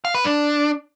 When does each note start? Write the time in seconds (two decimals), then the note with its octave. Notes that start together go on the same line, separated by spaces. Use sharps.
0.05 F5
0.15 B4
0.24 D4